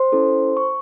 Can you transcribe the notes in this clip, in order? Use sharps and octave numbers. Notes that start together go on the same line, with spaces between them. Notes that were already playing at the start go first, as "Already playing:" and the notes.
Already playing: C5 C6
C#4 E4 A4
C#6